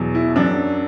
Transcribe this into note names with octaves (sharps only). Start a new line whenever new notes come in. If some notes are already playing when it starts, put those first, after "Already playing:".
Already playing: E2 B2 F#3
E4
F#2 F#3 D4